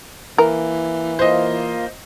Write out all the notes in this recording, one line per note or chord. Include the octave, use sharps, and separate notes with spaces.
E3 A#3 A#4
A#3 F4 C5 D#5 F5